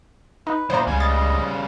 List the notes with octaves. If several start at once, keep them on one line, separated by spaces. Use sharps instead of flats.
D#4 B4
A#2 E3 B3 C5 A#5
C#2 C#3 G3 G#5
D#5 A6